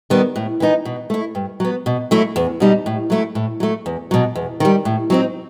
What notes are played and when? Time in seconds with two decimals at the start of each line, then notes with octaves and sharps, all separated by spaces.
0.10 D#3 G3 B3
0.36 A2
0.60 E3 B3 D#4
0.85 B2
1.10 A3 E4
1.35 G2
1.60 F#3 B3
1.86 B2
2.11 F#3 A3 E4
2.36 E2
2.60 B2 G3 D#4
2.86 A2
3.10 F#3 A3 E4
3.35 A2
3.60 F#3 A3
3.86 E2
4.11 B2 F#3
4.35 E2
4.60 D#3 G3
4.85 A2
5.10 F#3 C4 D#4